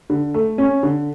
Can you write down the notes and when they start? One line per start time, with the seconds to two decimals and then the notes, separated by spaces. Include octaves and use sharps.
0.10 D3
0.34 A3
0.58 C#4
0.83 D3